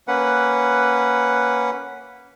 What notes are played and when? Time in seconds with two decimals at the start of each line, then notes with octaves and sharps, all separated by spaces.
0.08 A#3 C#4 B4 F#5